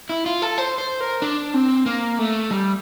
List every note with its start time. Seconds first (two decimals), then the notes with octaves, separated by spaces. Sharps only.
0.09 E4
0.26 F4
0.42 A4
0.58 C5
0.78 C5
1.00 A#4
1.22 D4
1.54 C4
1.86 A#3
2.19 A3
2.51 G3